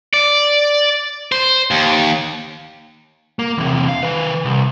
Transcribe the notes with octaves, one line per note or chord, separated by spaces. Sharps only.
D5
C5
D#2
A#3
E2 C3
F5
D#3 B4
C2